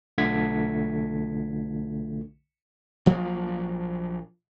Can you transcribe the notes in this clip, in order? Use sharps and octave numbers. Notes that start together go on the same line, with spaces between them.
B1 D3 A3 F4 G#6 B6
A#1 F3 F#3 A#3